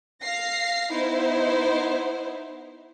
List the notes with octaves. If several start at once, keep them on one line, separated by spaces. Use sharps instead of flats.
F5 A#6 C7
B3 D#4 E4 C5